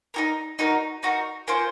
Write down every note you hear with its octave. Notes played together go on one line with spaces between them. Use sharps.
D#4 F#4 A#4
D#4 F#4 A#4
D#4 F#4 A#4
A#3 C#4 F4 C5